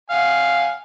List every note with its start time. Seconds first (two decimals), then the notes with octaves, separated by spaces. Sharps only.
0.10 F5 F#5 G#5